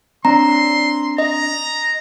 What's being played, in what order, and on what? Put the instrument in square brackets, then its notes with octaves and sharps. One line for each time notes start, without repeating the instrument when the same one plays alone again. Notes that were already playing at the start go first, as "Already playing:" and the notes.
[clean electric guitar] C4 D4 [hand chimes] A#5 [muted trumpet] C6
[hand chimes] D#5 [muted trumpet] A#5